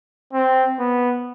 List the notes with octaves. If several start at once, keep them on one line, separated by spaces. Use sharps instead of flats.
C4
B3